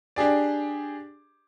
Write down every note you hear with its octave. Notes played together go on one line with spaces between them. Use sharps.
D4 G4 G#4 D5